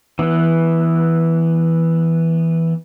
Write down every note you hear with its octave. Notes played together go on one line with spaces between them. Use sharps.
E3 B3